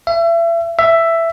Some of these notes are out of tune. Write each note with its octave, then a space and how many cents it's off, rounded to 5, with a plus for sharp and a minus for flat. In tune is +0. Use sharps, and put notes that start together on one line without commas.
E5 +35
E5 +10